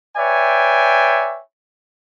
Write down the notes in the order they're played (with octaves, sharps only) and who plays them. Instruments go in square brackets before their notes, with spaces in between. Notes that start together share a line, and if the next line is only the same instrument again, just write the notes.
[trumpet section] B4 C#5 D5 E5 G5 G#5